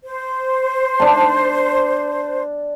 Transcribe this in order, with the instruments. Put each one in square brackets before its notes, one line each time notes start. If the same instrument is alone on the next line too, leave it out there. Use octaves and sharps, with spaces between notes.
[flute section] C5
[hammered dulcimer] D4 A5